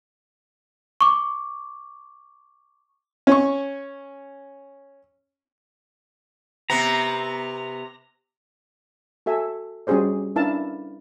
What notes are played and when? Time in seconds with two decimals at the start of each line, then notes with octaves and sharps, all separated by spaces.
1.01 C#6 D6
3.27 C#4 C#6
6.70 C3 B3 A#5
9.26 F#4 A4 E5 G#5
9.87 G3 C#4 F#4 G#4 C5 D5
10.36 C#4 D4 E4 A#4 F5 A5